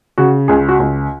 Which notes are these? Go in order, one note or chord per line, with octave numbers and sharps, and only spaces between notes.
C#3 F#4
C#2 G#4
F#4
C#2